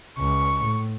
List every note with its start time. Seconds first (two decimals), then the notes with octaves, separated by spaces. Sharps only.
0.19 C#2 C#6
0.62 A2